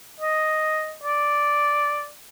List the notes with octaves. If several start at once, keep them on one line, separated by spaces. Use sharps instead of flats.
D#5
D5